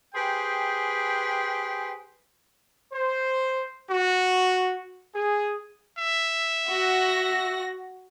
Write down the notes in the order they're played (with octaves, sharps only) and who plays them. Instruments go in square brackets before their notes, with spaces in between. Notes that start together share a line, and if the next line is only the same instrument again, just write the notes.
[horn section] G4 G#4 B4 C5 G5 G#5
[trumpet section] C5
F#4
G#4
[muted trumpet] E5
[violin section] F#4 A#6